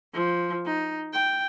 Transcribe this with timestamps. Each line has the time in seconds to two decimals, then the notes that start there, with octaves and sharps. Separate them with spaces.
0.14 F3
0.66 D#4
1.13 G5